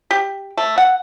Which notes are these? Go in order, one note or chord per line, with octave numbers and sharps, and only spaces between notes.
G4
A3
F#5